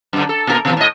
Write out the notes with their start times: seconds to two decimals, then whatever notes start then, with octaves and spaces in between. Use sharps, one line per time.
0.13 F#2 D3
0.29 A4
0.47 A#2 E4 A#4
0.65 B2 D#3 E3
0.77 A2 D#5